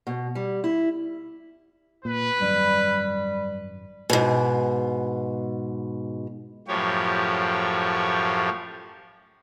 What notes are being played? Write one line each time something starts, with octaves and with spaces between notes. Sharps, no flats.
B2
G3
E4
A#2 B4
G#1 F#2 G3
G#2 B2
F#2 A2 F3 G4 C#5